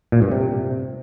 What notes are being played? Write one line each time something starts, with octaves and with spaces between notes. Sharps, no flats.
A#2
G2
C3